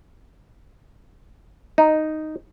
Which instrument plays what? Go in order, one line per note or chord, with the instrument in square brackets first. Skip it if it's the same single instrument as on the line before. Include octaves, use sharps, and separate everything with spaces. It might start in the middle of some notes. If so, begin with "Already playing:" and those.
[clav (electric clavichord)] D#4